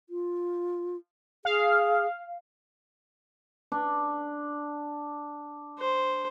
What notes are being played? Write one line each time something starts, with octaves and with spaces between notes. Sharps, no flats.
F4
G#4 F5
D4
C5